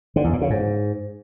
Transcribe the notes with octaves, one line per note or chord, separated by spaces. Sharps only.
D3
E2
A#2
C#3
G#2